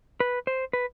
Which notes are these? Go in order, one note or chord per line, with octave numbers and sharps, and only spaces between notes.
B4
C5
B4